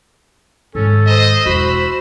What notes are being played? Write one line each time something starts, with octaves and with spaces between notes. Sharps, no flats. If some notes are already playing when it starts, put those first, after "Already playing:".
G#2 D#3 C#4 A4
C5 D#5 E6
E1 E2 F#4 B5